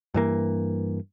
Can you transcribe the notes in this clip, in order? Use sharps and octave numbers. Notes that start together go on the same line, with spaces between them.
G2 E3 A#3